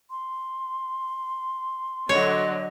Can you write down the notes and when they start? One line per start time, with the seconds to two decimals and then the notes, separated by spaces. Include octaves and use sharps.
0.10 C6
2.09 D3 F#3 C#5 D#5